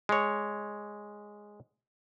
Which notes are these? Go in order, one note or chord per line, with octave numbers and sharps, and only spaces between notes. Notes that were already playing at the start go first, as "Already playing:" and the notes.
G#3 C#5